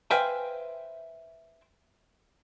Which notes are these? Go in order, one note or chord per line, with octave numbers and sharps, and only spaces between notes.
B4 C5 E5 F5 G5 G#5